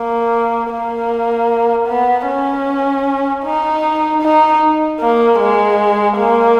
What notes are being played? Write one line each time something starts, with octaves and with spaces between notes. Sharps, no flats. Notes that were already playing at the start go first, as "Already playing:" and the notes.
Already playing: A#3
A#3
B3
C#4
D#4
D#4
A#3
G#3
A#3